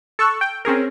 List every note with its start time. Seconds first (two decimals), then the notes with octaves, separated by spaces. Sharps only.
0.19 A4 C#6 E6 F#6
0.41 G5
0.65 C4 C#4 G#4 A#4